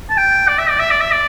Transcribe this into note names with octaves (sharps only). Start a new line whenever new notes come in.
A5
G5
D5
E5
D5
E5
D5
E5
D5